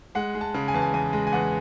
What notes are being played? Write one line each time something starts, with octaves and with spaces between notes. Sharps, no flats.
G#3 F#5
G#3
A5
C#3
G#5
E2 A5
G#5
E2 G#5
G#3
G#5
E2 F#5